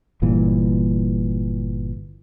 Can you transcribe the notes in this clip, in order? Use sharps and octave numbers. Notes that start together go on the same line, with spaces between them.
G1 G2 A#2 E3